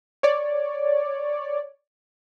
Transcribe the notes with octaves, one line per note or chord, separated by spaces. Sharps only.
C#5 D5